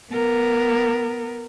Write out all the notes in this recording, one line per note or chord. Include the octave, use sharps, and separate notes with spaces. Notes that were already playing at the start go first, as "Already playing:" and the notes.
B3 A#4